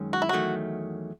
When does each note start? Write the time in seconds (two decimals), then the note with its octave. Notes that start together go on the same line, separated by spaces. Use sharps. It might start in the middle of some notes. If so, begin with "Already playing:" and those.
Already playing: F#2 D#3 G#3 C#4
0.13 F#4
0.22 E4
0.29 E2 D#3 F#3 A3 F#4